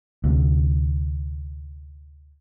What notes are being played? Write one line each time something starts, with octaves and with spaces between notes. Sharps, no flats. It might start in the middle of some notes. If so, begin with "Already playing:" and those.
D2 C3